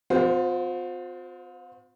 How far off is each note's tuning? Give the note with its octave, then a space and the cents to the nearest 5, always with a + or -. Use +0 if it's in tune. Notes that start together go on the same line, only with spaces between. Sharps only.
C4 -45 F4 +45 C5 +0